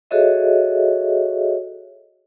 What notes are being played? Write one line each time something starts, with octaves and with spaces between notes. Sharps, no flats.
F#4 G#4 A4 C#5 D#5 E5